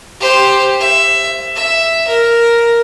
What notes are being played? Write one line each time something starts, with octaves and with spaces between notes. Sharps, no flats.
G4 C5
E5
E5
A#4